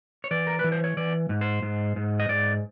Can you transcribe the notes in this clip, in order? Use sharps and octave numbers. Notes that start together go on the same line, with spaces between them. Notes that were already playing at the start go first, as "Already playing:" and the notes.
C#5
E3 D5
A#4
B4
E3
C5
C#5
E3 D5
G#2
C5
G#2
G#2
D#5
G#2 D5